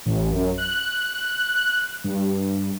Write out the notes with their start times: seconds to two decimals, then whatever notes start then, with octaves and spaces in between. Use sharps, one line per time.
0.06 A1
0.32 F#2
0.58 F#6
2.04 G2